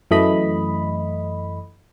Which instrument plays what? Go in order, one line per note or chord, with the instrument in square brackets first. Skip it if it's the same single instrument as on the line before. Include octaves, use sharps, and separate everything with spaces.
[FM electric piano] F#2 E3 A3 D#5 B5